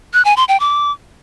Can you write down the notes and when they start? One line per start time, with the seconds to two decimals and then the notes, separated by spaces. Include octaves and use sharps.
0.13 F#6
0.25 G#5
0.37 C6
0.48 G5
0.60 D6